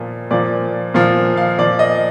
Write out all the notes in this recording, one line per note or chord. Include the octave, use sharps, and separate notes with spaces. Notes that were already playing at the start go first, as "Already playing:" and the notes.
Already playing: A#2 F3
A#2 F3 D5
A#2 F3 F5
F5
A#2 F3 D5
D#5